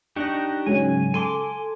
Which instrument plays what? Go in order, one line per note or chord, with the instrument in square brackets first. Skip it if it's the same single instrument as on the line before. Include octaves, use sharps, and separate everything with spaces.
[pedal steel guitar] D4 D#4 G4 [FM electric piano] C#6 F#6 A#6
[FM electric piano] G#2 C#3 F#3 [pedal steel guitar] G#5
[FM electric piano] A4 [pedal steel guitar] G#5 C6 D6